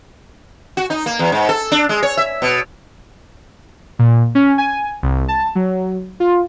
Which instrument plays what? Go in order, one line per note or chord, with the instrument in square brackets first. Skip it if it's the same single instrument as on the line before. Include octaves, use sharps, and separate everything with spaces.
[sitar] F#4
D#4
A#3
E2
G#2
A4
D4
G#3
C#5
E5
B2
[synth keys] A#2
C#4
G#5
C2
A5
F#3
F4